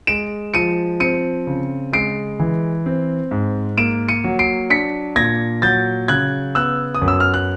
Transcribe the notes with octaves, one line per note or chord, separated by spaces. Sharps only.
G#3 D7 E7
F3 C#7 D#7
C4 C#7 D#7
C#3
G#3 C7 D7
E3
C4
G#2
A#3 D7 E7
C#7 D#7
F#3
C7 D7
D4 B6 C#7
A#2 G#6 A#6
F#3 G6 A6
C#3 F#6 G#6
B3 E6 F#6
D#6
F#2
E6
F6
F#6